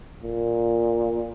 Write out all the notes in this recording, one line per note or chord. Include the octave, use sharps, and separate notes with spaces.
A#2